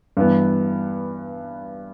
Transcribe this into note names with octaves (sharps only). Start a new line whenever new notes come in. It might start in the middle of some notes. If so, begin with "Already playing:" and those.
G2 E3 B3